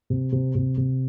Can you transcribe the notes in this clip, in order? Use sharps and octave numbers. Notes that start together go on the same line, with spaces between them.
C3
C3
C3
C3